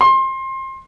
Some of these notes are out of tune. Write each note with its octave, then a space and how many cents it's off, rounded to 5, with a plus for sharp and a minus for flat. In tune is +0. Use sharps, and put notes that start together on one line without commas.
C6 +25